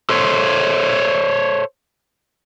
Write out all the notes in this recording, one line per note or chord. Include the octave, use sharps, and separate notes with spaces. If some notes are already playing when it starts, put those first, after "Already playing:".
A4 C5 C#5